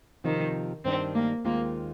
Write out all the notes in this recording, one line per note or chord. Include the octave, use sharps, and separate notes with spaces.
C3 D#3 F3 C4 D#4
G2 D#3 G3 C4 D4
A#3
D#2 D#3 G#3 A#3 C4 F4